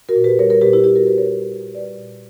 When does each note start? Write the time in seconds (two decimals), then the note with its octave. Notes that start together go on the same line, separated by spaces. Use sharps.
0.09 F#4 A#4
0.16 A#2
0.24 G4 B4
0.39 G3 A#4 C#5
0.50 A#4 C#5
0.61 A#2 G4 B4
0.73 E4 G4
0.84 G3 E4 G4
0.95 F#4 A#4
1.07 A#2 G4 B4
1.18 A#4 C#5
1.30 G3
1.53 A#2
1.75 G3 B4 D5
1.98 A#2